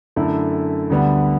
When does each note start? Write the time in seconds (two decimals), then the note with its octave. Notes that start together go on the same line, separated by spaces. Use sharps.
0.16 F#2 D3 A3 E4
0.90 D2 D3 G3 B3